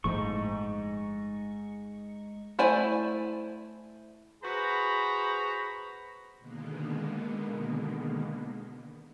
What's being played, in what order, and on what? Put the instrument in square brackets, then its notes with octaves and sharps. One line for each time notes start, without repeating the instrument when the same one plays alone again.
[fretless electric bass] G1 A2 F3 [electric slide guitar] G#3 D#4 [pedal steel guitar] C#6
[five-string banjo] A3 E4 C5 D5 G#5
[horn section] F#4 G#4 B4 C5 A#5 B5
[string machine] B2 D3 D#3 G#3 A#3 B3